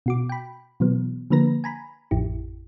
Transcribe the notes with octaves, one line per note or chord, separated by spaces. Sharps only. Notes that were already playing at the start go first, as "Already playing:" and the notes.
B2 F#4 D6
G5 B5
B2 E3 F#3 B3
D3 F3 A#3 B4 A#5 A#6
G#5 A#5 B5
A1 F2 E4 G4